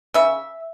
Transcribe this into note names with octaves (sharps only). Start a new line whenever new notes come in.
C#3 E5